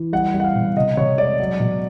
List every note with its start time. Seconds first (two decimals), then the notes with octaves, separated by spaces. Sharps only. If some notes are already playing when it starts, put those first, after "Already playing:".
Already playing: E3
0.13 G3 F#5
0.34 G3
0.40 F#5
0.44 F5
0.55 B2
0.76 C3 D#5
0.97 C3 C#5
1.18 G#3 D5
1.40 F#3
1.60 B2